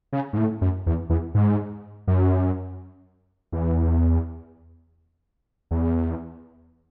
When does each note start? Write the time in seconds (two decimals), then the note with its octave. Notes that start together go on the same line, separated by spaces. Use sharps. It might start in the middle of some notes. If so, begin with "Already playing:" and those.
0.13 C#3
0.33 G#2
0.37 A2
0.61 F#2
0.86 E2
1.10 E2
1.35 G#2
2.07 F#2
3.52 E2
5.71 E2